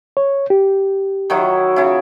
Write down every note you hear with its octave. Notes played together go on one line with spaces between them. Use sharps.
C#5
G4
D#3 F#3 E4
C#3 E4